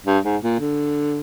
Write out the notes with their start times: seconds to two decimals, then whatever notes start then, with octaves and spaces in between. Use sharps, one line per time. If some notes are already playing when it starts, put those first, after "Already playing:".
0.06 G2
0.24 G#2
0.43 A#2
0.60 D3